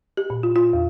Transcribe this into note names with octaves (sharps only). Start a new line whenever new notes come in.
G4
A#2
F4
F4
E2